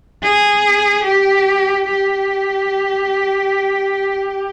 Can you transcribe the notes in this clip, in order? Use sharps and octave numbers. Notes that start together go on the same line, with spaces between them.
G#4
G4
G4